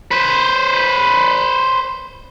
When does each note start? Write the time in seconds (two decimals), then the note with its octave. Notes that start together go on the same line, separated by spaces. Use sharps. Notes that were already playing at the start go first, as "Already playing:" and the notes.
0.11 B4 C5